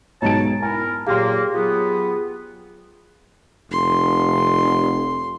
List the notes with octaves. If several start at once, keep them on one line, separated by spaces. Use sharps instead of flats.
B1 G#2 C#5 A5 A#5 D7
E4 A#4 G#5
A#2 F#3 A#3 G4 G#4 F5 C6
F#3 B3 F4 G#4
F1 C6